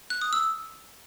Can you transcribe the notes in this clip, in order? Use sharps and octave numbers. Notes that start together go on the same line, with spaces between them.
F#6
D#6
E6